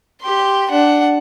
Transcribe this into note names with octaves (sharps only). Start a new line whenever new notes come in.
G4 C6
D4 F#5